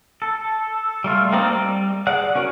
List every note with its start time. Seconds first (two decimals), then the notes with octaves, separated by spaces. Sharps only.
0.22 A4
1.04 G3 A3 F4
1.32 A#3 C4 D#4 G4 D5
1.49 G3
2.07 G#4 D5 F#5 F#6
2.35 C#4 F#4 A#4